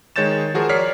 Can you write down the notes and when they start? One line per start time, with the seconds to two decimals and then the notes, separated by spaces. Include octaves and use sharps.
0.16 D#3 G#3 C#5 G6 A6 E7
0.54 F3 F#4 G#4 A#4 C5
0.69 C#5 D5 A#5 F6 B6 C7